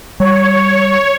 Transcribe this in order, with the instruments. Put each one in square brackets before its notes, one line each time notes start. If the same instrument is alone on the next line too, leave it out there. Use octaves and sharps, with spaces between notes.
[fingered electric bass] G3 [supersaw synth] C#5